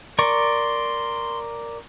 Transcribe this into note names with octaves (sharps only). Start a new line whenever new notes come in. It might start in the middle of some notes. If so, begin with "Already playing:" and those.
A#4 D5 C6 C#6